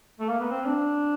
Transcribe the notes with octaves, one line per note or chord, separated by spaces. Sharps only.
A3
A#3
B3
C4
D4